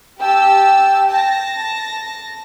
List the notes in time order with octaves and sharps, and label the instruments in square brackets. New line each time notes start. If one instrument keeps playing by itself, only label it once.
[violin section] G4 A5 E6 [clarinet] G5
[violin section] A5 A#6